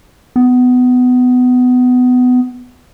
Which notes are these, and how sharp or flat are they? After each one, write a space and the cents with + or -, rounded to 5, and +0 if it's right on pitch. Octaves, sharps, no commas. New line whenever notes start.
B3 +20